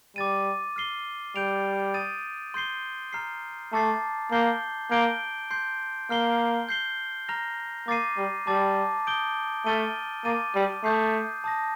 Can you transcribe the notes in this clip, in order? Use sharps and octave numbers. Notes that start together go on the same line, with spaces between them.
G3 D6 A6 D#7
F6 C7 G7
G3 G6 D7 F7
D#6 A6 D#7
C6 G6 C7 G7
A#5 F6 C7
A3 A5 D6 A6 C7
A#3 G6 C7 G7
A#3 G6 D7 G7
C6 G6 C7
A#3 F6 C7 G7
G6 C7 G7
A#5 F6 A#6 F7
A#3 D6 A6 C7 D#7
G3
G3 A5 D6 A6
D#6 G6 D7 G7
A3 F6 A6 D#7 G7
A#3 D6 A6 D#7
G3
A3 D#6 G6 C7
A5 D#6 A#6